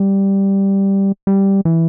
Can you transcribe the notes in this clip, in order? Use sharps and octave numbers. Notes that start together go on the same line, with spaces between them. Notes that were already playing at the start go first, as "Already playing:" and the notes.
Already playing: G3
G3
E3